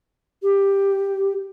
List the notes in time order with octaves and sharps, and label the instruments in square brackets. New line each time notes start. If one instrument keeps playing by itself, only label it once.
[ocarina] G4